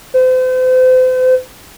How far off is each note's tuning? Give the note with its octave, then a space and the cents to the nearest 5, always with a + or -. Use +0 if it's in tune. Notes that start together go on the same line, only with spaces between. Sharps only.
C5 -40